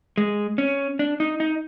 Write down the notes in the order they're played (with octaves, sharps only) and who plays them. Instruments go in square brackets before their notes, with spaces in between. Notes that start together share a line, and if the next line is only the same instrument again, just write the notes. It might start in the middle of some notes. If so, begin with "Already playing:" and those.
[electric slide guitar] G#3
C#4
D4
D#4
D#4